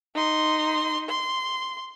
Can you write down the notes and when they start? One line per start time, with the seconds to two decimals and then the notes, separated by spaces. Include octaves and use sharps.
0.15 D#4 C6
1.09 C6